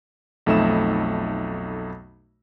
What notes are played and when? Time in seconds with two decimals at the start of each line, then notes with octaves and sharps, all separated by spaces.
0.46 B1 F2 A3 D#4 E5 E7